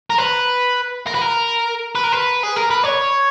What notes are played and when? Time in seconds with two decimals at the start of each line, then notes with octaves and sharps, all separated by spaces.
0.10 A#4
0.18 B4
1.07 A#4
1.14 B4
1.21 A#4
1.95 B4
2.04 A#4
2.12 B4
2.43 G#4
2.56 A#4
2.70 B4
2.84 C#5